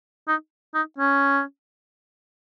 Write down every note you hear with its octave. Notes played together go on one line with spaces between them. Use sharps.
D#4
D#4
C#4